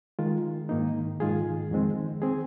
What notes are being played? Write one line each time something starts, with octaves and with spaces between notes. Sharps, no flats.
D#3 G#3 F4 A#4
G#2 D#3 A#3 D#4
G#2 D#3 G#3 F4 G#4
F2 D#3 G#3 C4
D#3 C4 G#4